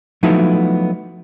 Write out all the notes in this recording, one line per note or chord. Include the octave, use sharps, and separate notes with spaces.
F3 F#3 A3 B3 D#4 E4